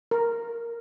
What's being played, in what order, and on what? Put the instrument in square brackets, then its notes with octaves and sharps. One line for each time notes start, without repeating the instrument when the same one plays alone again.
[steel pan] A#4